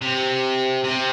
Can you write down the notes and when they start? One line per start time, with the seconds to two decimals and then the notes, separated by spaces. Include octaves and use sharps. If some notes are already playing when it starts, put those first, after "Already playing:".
0.01 C3
0.84 C3